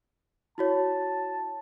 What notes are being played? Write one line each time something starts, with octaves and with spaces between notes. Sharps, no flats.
E4 F#4 C#5 A5